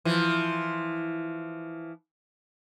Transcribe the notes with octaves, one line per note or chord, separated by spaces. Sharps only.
E3 F3